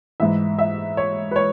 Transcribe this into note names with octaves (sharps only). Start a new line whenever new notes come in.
G#2 E3 E5
E5
C#5
B4
C#5